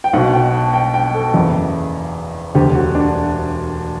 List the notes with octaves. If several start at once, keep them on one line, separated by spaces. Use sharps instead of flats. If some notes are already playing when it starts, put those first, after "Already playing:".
G5
B1 B2 F#5
G5
A5
G5
G5
A4
F#1 E2 C#3
E1 D2 D3 G4
F#4
D4